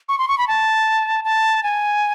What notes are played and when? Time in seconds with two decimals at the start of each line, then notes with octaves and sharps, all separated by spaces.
0.09 C#6
0.19 C6
0.28 C#6
0.38 B5
0.48 A5
1.24 A5
1.63 G#5